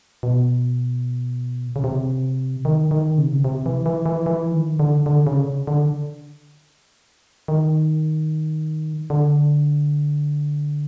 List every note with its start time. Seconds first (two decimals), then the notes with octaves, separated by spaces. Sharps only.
0.23 B2
1.76 C#3
1.84 C3
2.65 D#3
2.91 D#3
3.18 C#3
3.25 C3
3.32 C#3
3.44 C3
3.66 E3
3.86 E3
4.06 E3
4.26 E3
4.52 D#3
4.80 D3
5.06 D3
5.27 C#3
5.67 D3
7.48 D#3
9.10 D3